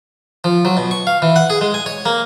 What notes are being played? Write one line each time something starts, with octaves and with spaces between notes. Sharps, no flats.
F3
F#3
B2
C#6
F5
E3
F#5
G#4
G#3
G#5
C#5
A#3